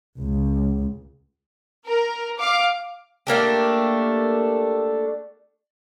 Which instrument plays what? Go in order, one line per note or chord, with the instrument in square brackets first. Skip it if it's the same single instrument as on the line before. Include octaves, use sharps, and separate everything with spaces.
[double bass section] C#2
[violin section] A#4
F5 D6
[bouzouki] A3 A#3 D4 G4